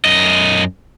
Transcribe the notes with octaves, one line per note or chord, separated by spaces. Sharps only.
F#2 D#5